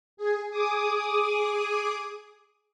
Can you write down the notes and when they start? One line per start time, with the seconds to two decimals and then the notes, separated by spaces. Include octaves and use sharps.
0.17 G#4
0.50 G#4 D6 D#6